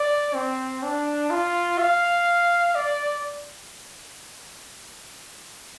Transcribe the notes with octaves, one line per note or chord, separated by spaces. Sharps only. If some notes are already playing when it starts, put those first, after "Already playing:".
Already playing: D5
C4
D4
F4
F5
D5